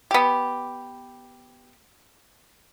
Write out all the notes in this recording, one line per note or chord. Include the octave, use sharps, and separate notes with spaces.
B3 G4